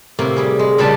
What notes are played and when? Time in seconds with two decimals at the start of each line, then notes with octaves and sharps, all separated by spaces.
0.19 A2 C3 A#3
0.36 G3 G#4
0.59 G#3
0.78 A#2 C#3 G3 D4 G4 A5